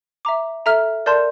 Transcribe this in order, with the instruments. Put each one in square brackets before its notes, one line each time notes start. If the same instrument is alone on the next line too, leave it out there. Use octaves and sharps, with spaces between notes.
[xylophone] E5 A#5 D6
A4 E5 A#5 F6
A#4 D5 A5 C6 G6